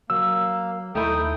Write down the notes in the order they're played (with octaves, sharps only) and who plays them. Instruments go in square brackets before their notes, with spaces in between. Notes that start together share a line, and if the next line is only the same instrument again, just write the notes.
[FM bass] F#3 [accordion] A#3 [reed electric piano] E6
[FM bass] D#2 [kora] A3 D#4 E4 [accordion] G5 D#6